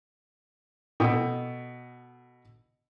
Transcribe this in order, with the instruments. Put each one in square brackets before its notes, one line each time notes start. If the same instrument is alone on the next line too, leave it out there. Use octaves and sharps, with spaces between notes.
[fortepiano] B2 A4 G5 D#6